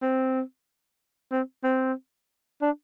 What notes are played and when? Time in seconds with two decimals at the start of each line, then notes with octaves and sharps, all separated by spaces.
0.02 C4
1.32 C4
1.64 C4
2.62 D4